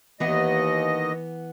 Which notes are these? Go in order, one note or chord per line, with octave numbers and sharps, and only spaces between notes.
D#2 E3 B3 D#5 F#5